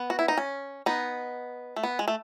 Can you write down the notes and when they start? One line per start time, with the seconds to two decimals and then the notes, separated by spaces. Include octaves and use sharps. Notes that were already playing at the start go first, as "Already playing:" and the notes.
Already playing: B3
0.10 F#4
0.19 E4
0.28 D#4
0.37 C#4
0.86 B3 D#4
1.76 A3
1.83 B3
1.99 G#3
2.08 A3